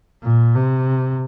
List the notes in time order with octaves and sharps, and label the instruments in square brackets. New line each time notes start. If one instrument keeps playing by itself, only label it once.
[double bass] A#2
C3